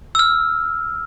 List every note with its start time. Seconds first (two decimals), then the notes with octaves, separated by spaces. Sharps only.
0.15 E6 F6